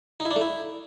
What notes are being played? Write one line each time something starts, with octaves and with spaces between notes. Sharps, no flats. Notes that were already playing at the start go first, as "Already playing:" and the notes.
D#4
E4
D4
A3
E4